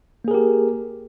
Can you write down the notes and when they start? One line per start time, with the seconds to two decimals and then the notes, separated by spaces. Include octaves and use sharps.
0.24 A#3
0.28 G#4
0.31 A#4
0.34 G4